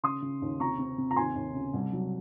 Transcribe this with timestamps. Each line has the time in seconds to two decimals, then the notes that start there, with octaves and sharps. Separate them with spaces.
0.03 C#3 C6 D#6
0.22 C#3
0.42 D#2
0.60 C3 A#5 C#6
0.79 C4
0.98 C3
1.11 A#5
1.16 D#2 G#5 C6
1.36 D#2
1.55 C#3
1.73 C2
1.93 F#3